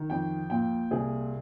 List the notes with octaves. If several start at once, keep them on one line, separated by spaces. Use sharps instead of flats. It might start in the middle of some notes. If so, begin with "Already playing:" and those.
Already playing: D#3
F2 G5
A#2 G5
C2 G#4